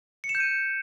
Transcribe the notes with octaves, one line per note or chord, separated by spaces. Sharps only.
C#7
E7
G6
D#7